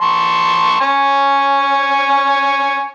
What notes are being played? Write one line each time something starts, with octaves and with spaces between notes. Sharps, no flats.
A5 C6 C#6
G#5 C#6